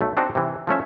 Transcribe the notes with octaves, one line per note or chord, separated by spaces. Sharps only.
B1 A3
C4 D4 D#4 F#4 C5
C3 E3
F3 A3 C#4 E5